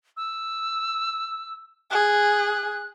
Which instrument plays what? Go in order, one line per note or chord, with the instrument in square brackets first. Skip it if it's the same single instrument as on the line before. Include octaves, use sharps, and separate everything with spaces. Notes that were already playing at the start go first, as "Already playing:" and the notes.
[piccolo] E6
[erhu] G#4 [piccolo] F#6